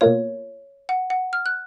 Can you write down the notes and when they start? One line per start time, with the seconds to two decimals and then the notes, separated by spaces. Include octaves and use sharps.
0.01 B2 A#3 F4 C#5
0.89 F#5
1.10 F#5
1.33 F6
1.46 F#6